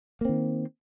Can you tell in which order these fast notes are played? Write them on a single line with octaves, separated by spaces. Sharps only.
A#3 C4 D#3